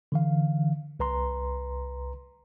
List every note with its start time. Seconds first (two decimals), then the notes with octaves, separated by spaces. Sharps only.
0.12 D3 E3 F5
1.00 C2 B4 A#5 C6